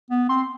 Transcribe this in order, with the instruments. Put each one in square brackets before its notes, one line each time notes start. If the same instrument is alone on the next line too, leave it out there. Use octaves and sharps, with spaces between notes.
[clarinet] B3
[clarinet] C4 [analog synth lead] C6